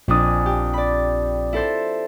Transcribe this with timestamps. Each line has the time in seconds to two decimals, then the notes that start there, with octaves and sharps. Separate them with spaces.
0.08 A#1 F2 D4 G#5 D#6
0.46 G4
0.73 D5 B5
1.53 E4 A4 C5